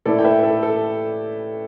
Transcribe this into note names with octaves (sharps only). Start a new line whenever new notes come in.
A2 A3 E4 A4 D5
G5
B4 E5
A4
A4